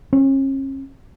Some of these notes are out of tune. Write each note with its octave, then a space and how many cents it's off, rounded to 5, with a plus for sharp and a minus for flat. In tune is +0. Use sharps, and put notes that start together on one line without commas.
C#4 -40